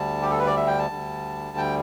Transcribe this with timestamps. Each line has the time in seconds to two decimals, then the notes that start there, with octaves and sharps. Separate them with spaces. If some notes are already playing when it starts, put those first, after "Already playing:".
Already playing: D2 D3 G3 A5
0.22 G4
0.31 A4
0.39 B4
0.47 D5
0.56 E5
0.67 G5
0.79 A5
0.90 D2 D3 G3
1.57 G5